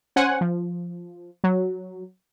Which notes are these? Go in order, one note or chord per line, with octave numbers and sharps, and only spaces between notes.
C#4 C5 F#5 G#5
F3
F#3